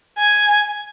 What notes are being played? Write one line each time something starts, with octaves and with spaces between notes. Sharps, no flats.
G#5